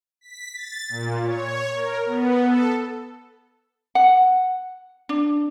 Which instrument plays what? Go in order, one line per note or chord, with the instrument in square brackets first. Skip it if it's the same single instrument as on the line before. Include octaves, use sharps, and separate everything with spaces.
[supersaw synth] B6
A6
A#2
C#5
A#4
B3
A4
[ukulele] F#5
D4